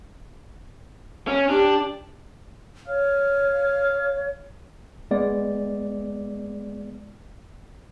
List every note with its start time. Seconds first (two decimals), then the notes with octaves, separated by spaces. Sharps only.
1.28 C#4
1.50 D4 G4
2.88 C#5 F5
5.11 G#3 B3 D5